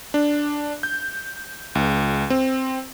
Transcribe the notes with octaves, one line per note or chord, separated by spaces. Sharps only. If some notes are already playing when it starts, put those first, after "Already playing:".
D4
G6
C#2
C4